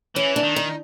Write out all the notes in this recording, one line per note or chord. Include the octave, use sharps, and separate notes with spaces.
E3 C#4
D4
D#3
D#4